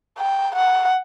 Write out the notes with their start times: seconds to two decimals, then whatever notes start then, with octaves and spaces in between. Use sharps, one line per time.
0.18 G5
0.55 F#5